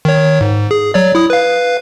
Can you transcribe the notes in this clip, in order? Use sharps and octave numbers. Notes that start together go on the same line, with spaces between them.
D#3 C#5
G#2
G#4
F#3 C#5 D5
E4 D#6
B4 F5